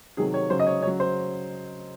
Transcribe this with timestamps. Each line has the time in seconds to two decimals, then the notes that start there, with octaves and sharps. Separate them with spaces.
0.17 C3 D#3 F#3 G#4
0.34 C#5
0.50 C#3 F#3 C5
0.60 D#5
0.67 C#5
0.82 C#3 F#3 C#5
1.00 C5